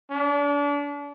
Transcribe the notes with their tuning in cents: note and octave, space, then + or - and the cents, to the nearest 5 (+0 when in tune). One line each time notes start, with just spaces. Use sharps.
D4 -35